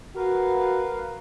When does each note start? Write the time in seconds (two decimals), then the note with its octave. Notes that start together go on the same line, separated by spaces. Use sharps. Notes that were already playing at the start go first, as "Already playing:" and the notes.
0.16 F#4 A#4 B4 F5